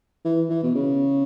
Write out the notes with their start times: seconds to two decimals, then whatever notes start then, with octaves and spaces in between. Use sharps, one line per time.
0.25 E3
0.50 E3
0.63 B2
0.75 C#3